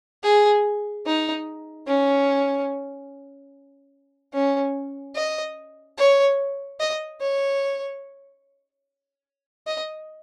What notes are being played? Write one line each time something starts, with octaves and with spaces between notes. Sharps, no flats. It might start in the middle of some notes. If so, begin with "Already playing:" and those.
G#4
D#4
C#4
C#4
D#5
C#5
D#5
C#5
D#5